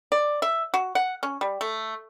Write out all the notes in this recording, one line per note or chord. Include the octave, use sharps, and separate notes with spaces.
D5
E5
F#4
F#5
C#4
G3
A3